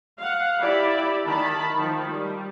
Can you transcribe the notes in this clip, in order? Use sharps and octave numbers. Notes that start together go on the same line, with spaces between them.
F5 F#5
E4 G4 D5 E5 B5
D#3 A5 B5
D#3 F3
G3